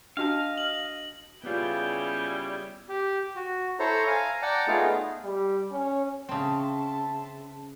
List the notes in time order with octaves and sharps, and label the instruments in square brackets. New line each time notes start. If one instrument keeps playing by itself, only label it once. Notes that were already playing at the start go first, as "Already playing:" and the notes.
[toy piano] D4 F#4 A5 [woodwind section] D#5 [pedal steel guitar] F5
[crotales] F#7
[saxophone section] C#3 G3 [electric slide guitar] B3 F4 [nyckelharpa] E4 G5
[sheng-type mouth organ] G4
F#4
E4 A4 C5 C#5 A#5
F5 G#5 A#5
D5 F#5 G5 A5 A#5
A3 B3 D#4 F4 G#4
[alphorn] G3
C#4
[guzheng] C#3 C4 [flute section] E5 A5 C6